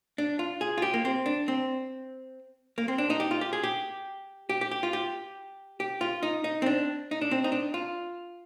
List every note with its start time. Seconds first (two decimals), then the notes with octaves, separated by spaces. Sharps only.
0.18 D4
0.39 F4
0.61 G#4
0.78 F4
0.82 G4
0.94 A#3
1.05 C4
1.26 D4
1.48 C4
2.78 A#3
2.88 C4
2.98 D4
3.10 D#4
3.20 G4
3.31 F4
3.41 G4
3.53 G#4
3.63 G4
4.49 G4
4.61 G4
4.71 G4
4.83 F4
4.93 G4
5.80 G4
6.01 F4
6.23 D#4
6.44 D#4
6.62 C4
6.66 D4
7.11 D#4
7.21 D4
7.31 C4
7.44 D#4
7.52 D4
7.74 F4